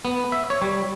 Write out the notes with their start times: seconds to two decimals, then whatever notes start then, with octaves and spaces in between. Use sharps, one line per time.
0.05 B3
0.32 E5
0.50 C#5
0.62 G3